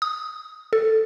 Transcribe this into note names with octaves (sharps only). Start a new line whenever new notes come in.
D#6
A4